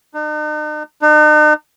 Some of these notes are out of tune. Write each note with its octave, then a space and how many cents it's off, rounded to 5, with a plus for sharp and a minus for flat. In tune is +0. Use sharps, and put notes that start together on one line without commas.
D#4 -45
D#4 -45